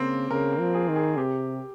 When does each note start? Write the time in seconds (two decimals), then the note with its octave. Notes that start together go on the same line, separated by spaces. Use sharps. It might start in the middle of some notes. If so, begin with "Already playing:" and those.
Already playing: C#3 A#3 C4
0.31 C#3 A#4
0.53 A#4
0.60 F3
0.74 G#4
0.89 D#3
0.96 G#4
1.17 C3 G4